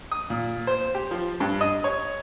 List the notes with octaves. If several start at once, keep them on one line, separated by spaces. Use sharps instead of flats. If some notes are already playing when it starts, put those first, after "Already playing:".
D#6
A#2
C5
G4
F3
G2
D#5
C#5